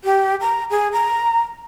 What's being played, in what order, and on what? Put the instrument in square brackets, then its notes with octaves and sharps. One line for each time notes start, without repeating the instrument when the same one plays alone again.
[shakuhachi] G4
A#5
G#4
A#5